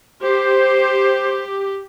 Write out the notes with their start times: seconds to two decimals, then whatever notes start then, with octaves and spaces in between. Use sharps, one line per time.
0.23 G4 C5